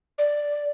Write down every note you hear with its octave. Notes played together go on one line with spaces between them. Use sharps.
D5